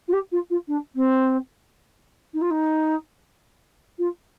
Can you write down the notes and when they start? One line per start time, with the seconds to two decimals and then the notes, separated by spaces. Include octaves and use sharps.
0.08 F4
0.13 G4
0.32 F4
0.50 F4
0.68 D4
0.95 C4
2.34 D#4
2.41 F4
2.50 D#4
3.98 F4